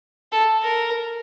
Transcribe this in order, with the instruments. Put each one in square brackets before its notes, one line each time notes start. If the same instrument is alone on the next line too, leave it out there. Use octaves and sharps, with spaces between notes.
[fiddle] A4
A#4